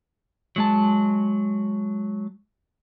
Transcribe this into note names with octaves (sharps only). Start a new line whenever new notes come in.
F#3 G#3 A5